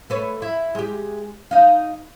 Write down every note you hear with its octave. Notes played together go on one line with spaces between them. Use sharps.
A3 B4 C#5
E4
G#3 G4
D#4 F5